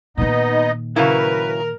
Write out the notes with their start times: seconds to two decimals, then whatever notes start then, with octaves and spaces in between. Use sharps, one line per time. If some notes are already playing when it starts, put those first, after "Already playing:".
0.18 A#2 D#3 B3 D#4 D#5
0.96 C#3 F#3 E4 A#4 B4